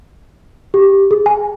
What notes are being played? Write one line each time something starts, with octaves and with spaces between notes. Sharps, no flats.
G4
G#4
G#5